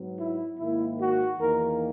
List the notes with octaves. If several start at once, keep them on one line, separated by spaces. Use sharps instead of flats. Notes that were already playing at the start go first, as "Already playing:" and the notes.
Already playing: G#2 F#3 B3
E4
G#2 D#3 A#3 E4
F#4
E2 D#3 A#3 A#4